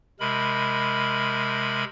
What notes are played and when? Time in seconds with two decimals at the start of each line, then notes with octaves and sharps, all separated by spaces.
0.20 C3 G#3 A#4 B5